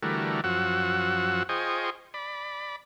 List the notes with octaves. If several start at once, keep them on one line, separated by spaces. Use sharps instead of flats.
D3 E3 G3 A3 F#4 A#4
F#2 F3 F#4 F#5 E6
F4 G#4 C5 D#5 G5 C#6
D5 B5